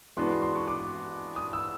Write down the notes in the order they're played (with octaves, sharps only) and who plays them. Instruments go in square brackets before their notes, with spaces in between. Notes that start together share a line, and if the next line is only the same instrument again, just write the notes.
[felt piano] E3 G#3 B3 D4 F#4 [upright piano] C6
[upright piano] C6
C6
C#6
D6
D#6
E6